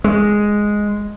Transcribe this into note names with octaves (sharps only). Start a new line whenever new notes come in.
G#3